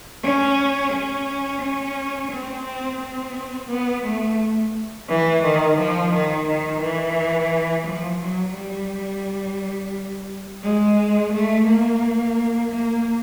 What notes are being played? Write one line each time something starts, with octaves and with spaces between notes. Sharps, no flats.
C#4
C#4
C#4
C4
C4
C4
B3
A3
E3
D#3
F3
D#3
D#3
E3
F3
F#3
G3
G#3
A3
A#3
A#3